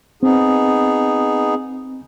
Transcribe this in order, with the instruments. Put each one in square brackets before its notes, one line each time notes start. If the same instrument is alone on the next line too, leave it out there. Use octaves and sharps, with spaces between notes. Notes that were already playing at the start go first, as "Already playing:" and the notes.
[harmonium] B3 D#4 G#4 [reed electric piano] C4